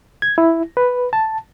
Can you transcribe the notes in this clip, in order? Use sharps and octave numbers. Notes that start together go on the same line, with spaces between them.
G#6
E4
B4
A5